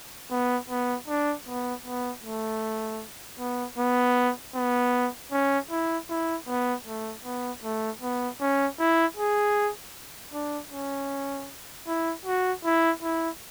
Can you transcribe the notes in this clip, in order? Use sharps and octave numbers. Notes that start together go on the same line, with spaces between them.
B3
B3
D4
B3
B3
A3
B3
B3
B3
C#4
E4
E4
B3
A3
B3
A3
B3
C#4
E4
G#4
D4
C#4
E4
F#4
E4
E4